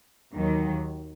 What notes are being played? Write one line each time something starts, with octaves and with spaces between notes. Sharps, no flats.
D#2 D#3 F#3